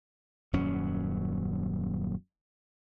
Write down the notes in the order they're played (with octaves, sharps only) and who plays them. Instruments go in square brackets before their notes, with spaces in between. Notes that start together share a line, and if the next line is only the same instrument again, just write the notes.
[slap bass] D#1 F#2 F#3 C#4